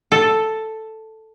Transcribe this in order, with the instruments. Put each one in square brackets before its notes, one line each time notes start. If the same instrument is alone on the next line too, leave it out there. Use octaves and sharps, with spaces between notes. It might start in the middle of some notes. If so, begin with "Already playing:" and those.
[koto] A4